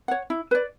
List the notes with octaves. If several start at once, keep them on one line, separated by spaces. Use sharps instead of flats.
C#5 F#5
E4
B4 D5